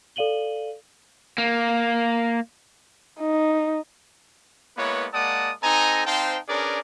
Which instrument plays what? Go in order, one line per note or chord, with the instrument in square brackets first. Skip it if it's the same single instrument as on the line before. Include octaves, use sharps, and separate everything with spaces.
[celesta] A4 D5 F5 D#7 F#7 G7
[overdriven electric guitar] A#3
[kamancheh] D#4
[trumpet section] G#3 A#3 B3 E4 B4 C#5
G#3 A#3 D5 F#5 A5 D#6
C4 D#4 A4 D#5 G#5 A#5
C4 D#4 C5 F5 G5 A5
C#4 D4 G#4 A#4 B4 D5